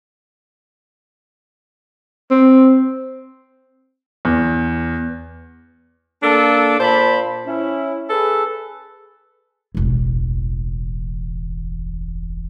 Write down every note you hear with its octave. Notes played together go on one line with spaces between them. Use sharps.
C4
E2
A#3 D4 A4
A#2 C5 A5 B5
C#4 E4
G#4 A4 B4
E1 A1